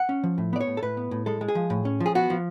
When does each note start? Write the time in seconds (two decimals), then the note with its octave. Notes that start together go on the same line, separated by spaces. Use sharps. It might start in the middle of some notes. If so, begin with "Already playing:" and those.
Already playing: F#5
0.09 C#4
0.24 F3
0.38 A2
0.53 B3 D5
0.61 C#5
0.67 A2
0.77 A4
0.83 A2 B4
0.97 B3
1.11 A2
1.26 G#3 A4
1.41 G#3
1.48 G#4
1.55 F3
1.70 A2
1.85 C#4
2.00 F3
2.06 G#4
2.15 B3 F#4
2.30 F3